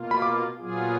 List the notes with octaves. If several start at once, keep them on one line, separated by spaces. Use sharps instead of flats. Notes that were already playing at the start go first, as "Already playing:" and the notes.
Already playing: B2 A#3 F4
B5
D6
A#2 F#3 B3 F4 G#4